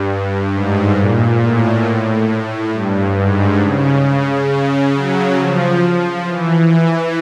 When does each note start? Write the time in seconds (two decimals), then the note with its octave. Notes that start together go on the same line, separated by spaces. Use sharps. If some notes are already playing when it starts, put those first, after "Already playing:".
Already playing: G2
0.53 G#2
0.97 A#2
1.41 A2
2.73 G2
3.17 G#2
3.61 C#3
4.05 C#3
4.49 C#3
4.94 F#3
5.37 F3
5.81 F3
6.25 E3
6.69 E3